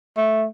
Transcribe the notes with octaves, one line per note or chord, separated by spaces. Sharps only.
A3